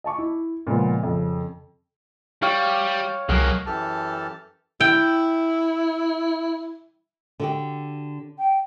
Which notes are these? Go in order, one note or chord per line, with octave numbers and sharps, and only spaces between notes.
D#5 A5 C#6 D6
E4
A#2 C#3 F3 G#3 B3
F2 C#3
G3 C#5 F5 G5
C2 F#3 G#3 A#3 F#5
F#2 E3 G4 A4 A5 F6
E4 G5
D3 F#4 G4
G5